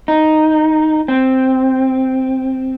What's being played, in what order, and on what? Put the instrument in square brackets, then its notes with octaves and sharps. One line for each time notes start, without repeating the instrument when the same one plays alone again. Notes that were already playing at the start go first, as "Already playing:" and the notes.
[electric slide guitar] D#4
C4